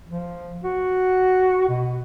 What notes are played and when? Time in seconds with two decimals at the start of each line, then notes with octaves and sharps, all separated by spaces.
0.08 F3
0.64 F#4
1.69 B2